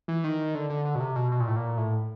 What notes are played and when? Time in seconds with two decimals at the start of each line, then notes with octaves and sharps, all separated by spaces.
0.08 E3
0.24 D#3
0.55 D3
0.70 D3
0.85 D3
0.95 B2
1.00 C3
1.16 B2
1.32 B2
1.40 A#2
1.48 A2
1.56 A#2
1.78 A2